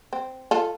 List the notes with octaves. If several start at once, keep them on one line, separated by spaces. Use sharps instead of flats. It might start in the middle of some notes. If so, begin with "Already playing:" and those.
C4
F4 A4